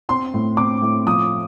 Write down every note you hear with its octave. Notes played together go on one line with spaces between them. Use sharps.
C4 C6
A2
C4 D6
A2
F3 D#6